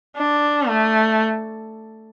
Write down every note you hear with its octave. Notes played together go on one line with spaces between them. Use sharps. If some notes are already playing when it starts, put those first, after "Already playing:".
D4
A3